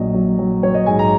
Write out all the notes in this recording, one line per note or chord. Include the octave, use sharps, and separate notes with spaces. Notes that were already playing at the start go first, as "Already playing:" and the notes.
Already playing: A#1 F#3 D#5
F#3
F#3
F#3 C#5
D#5
G#2 G#5
A#5